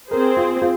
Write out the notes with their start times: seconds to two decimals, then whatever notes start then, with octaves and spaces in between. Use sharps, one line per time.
0.11 C4 G#4 A#4 C5
0.37 F4
0.62 F4